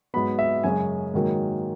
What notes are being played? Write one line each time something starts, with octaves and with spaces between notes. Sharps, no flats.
G#2 F#3 B3 B5
E5
F#2 C#3 G#3 C#4 G#5
G#2 D#3 F#3 A#3